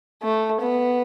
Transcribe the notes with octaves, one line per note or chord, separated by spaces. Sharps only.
A3
B3